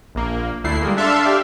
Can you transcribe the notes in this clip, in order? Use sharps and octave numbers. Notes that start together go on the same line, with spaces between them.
A#1 A#3
D2 A3 E4 C7
G3 G#3 A#3
D4 A4 E5 F5 A5 C6
G4 D5 E5 F5